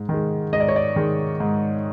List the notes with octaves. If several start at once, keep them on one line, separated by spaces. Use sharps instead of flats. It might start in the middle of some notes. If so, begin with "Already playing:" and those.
Already playing: G#2
D#3 G#3
G#2 D#5
D5
C#5
D5
D#3 G#3
G#2